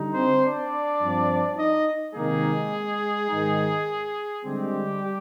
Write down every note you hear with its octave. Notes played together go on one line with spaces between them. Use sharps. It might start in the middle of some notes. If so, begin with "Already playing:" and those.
Already playing: D3 G3 D#4
C4 C5
D4 D5
G2 F3 C4
D#4 D#5
C3 D#3 G#3 A#3 D#4 G#4
G#2 D#3 G#3 D#4
D3 G3 G#3 C4 G4